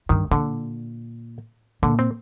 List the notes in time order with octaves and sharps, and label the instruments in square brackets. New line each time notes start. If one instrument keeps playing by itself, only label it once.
[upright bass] G2 [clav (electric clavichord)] D#3
[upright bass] A#2 [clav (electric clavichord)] D3
[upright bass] A#2 [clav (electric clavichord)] D3
[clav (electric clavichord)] C4